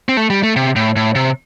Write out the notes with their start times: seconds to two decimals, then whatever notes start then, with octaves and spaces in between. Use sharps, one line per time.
0.09 C4
0.17 A3
0.30 G3
0.43 A3
0.56 C3
0.76 A2
0.96 A2
1.15 C3